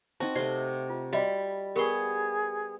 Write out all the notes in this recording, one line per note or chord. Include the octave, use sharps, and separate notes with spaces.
C4 D#4 F#4 D#5 A5
C3 A3 D5 C6
F4
G3 F#4 D#5 E5 B5
B3 G4 G#4 A#4 C6 C#6